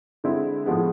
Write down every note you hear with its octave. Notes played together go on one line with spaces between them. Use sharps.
D3 G#3 C4 E4
A2 F3 G#3 B3